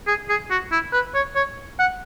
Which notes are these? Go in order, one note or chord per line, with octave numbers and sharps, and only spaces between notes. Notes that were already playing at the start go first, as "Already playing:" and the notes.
G#4
G#4
F#4
E4
B4
C#5
C#5
F#5